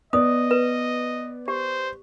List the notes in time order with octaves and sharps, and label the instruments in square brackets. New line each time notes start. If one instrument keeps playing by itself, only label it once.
[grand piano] B3 D5 [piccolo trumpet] D#5 [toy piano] D#6
[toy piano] B4
[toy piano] G4 [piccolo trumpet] C5